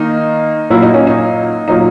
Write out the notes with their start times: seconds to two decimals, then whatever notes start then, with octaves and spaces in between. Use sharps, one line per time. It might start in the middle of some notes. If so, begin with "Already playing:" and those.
Already playing: D#3 A#3 D#4
0.70 A#2 F#3 A#3 E4
0.83 D#4
0.94 C#4
1.07 D#4
1.68 A#2 F#3 A#3 D#4